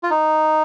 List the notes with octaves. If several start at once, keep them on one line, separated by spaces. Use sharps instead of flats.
F4
D#4